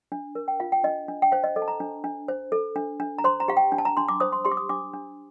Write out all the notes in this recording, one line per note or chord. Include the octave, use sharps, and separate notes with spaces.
D4
A#4
G5
F4 F5
G5
D4 D#5
D4
G5
C5 F5
D#5
A4 D#5
A5
A#5
D4
D4
C5
A4
D4
D4
A#5
C5 C6
A#5
G4 F5
G5
D4
A5
A#5
D4 C6
D6
C5 D#6
C6
G4 C6
D6
D#6
D4 D6
D4